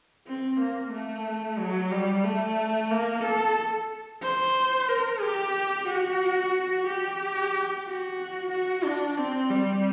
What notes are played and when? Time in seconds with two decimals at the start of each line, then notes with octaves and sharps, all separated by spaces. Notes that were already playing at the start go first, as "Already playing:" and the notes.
0.27 C4
0.60 A#3
0.93 A3
1.59 F#3
1.92 G3
2.25 A3
2.91 A#3
3.23 A4
4.22 C5
4.88 A#4
5.21 G4
5.87 F#4
6.87 G4
7.85 F#4
8.51 F#4
8.84 D4
9.17 C4
9.51 G3